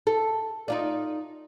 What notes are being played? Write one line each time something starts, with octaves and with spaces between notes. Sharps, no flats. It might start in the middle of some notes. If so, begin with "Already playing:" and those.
A4
D#4 F4 D5